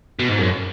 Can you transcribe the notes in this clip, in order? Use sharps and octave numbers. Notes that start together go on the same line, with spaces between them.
B2
G#2
F#2